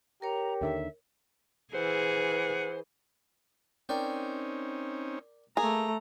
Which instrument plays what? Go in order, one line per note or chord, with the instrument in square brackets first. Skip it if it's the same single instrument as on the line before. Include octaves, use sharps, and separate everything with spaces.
[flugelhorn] G4 [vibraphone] A#4 C#5 [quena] A#5
[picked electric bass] D#2 D3 D#3 [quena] E5
[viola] E3 [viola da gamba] G#4 [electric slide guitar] C5 [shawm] F#5
[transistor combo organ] C4 C#4 D#4 [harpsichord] A#4 D5 G5
[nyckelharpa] A3 A#5 [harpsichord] A#3 [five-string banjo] G#4